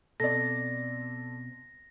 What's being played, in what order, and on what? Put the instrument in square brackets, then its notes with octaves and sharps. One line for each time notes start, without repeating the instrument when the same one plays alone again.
[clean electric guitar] B2 C4 [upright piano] A4 D5 [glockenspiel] A#6